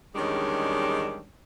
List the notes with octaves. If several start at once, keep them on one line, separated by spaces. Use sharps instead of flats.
E2 D#3 G3 G#3 C#4 D4